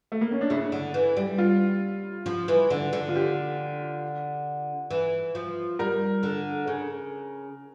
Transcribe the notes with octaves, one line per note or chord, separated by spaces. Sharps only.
A3
A#3
C#4
D4
C#3 E4
D3
E3
G3
F4
F3
E3
D3
D3
F4
G4
E3
F3
G3 A#4
D3
C#3